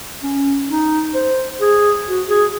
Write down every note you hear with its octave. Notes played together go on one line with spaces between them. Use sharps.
C#4
D#4
C5
G#4
F#4
G#4